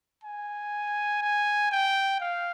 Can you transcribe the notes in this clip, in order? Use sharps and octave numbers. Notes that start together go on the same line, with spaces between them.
G#5
G#5
G5
F5